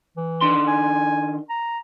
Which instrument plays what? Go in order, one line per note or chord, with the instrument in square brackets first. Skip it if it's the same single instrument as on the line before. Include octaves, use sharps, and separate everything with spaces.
[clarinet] E3
[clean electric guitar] D#3 D4 C6
[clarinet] G#5
A#5